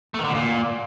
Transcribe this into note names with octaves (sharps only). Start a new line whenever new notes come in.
A3
D#3
D3
B2
A#2